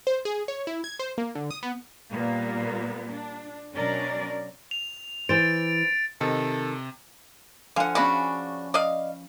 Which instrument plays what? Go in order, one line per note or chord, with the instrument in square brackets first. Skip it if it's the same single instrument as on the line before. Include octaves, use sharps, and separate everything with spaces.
[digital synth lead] C5
G#4
C#5
E4
G#6
C5
A#3
D3
D#6
B3
[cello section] A#2 G3 A#3 B3
D4
B2 F#3 C#4 D4 A#4 D5
[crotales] F7
[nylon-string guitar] E3 C5 [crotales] A6 D7
[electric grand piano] C3 [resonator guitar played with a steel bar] D#3 [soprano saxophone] A4
[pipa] D3 F#5 [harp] F3 F5 G#5
[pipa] C#3 D4 F#4 [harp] C#4 B5 C#6
[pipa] D5 D#5 F5